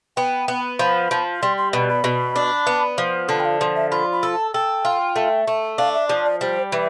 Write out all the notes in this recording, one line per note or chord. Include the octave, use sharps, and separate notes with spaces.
B3 G5
B3
F3 B5
F3
G3 C6
C6
B2 B5
B5
B2
D4
B3
F3
D3 A5
G5
F5
F3
E5
F4 B5
B5
A4
A5
A4 G5
F4
A3
A3
D4 F5
E5
F3 D5
D5
G3 C5
E3 B4